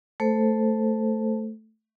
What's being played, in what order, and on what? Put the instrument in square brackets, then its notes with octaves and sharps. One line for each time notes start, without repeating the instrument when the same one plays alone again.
[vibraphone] A3 A4 C5